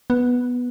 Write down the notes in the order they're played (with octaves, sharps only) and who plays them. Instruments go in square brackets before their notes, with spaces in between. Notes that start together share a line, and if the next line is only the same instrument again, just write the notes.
[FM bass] B3